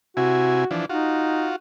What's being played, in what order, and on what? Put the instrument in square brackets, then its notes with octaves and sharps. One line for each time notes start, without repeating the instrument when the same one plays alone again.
[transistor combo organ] C3 E4 G#5 [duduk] F#4
[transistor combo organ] E3 F3 D4
[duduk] D#4 [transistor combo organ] F4 F#4